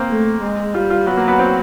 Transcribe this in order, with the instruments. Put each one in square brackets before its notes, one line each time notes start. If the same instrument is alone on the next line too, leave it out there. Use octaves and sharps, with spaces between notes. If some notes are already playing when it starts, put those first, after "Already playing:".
Already playing: [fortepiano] A#3 C4
[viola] A3
G#3
[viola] G3 [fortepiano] F4
[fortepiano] F4
[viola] F#3 [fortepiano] B3
[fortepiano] A#3
B3
C4